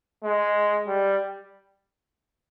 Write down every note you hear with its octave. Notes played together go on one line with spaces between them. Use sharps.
G#3
G3